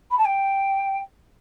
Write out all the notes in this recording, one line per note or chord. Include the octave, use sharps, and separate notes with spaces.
B5
A5
G5